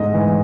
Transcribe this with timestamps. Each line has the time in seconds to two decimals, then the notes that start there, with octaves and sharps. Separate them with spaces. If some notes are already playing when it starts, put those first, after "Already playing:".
Already playing: G#2 A3 D#5
0.14 E3